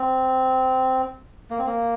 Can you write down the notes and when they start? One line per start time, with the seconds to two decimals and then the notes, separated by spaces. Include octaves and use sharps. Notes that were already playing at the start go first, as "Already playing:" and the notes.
Already playing: C4
1.51 A#3
1.59 C4
1.67 A#3